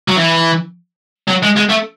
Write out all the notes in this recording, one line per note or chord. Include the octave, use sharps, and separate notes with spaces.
F#3
E3
F#3
G#3
G#3
A3